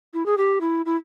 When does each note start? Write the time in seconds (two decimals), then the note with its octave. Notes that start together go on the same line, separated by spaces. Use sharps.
0.14 E4
0.26 G#4
0.38 G4
0.61 E4
0.86 E4